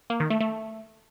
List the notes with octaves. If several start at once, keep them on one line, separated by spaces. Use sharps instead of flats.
A#3
D#3
A3
A3